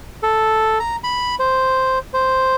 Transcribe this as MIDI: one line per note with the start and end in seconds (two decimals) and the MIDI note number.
0.23 0.79 69
0.80 0.96 82
1.04 1.35 83
1.40 1.99 72
2.14 2.56 72